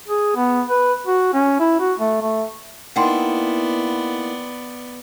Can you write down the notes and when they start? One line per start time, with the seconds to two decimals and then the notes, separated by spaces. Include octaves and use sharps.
0.08 G#4
0.36 B3
0.69 B4
1.07 F#4
1.34 C#4
1.60 E4
1.80 F#4
2.00 A3
2.21 A3
2.96 A#3 B3 D#4 E4 D5 F#5 G5 C6